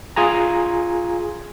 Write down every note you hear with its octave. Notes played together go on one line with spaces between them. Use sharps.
F4 G#4 G#5 A#5